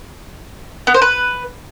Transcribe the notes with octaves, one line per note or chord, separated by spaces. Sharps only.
B3
C5
B4